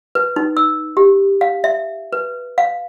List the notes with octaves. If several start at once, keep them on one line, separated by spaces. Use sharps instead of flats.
B4
D#4
E6
G4
F5
E5
B4
F5